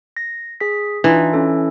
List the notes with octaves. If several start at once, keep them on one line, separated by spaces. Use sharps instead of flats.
A#6
G#4 B6
E3 D4 D#4 F4
C#4 A4